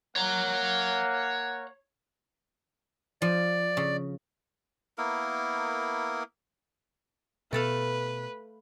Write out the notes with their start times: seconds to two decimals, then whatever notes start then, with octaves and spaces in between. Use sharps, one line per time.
0.16 A#3 C#5 F#5 A#5
3.22 F3 D5
3.77 C#3
4.98 A#3 B3 E4 A#4
7.53 B2 A3 A4 B4 F5